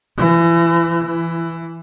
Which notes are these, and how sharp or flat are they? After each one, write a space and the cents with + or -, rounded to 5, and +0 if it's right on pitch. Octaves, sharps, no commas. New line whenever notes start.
E3 +30
E3 +10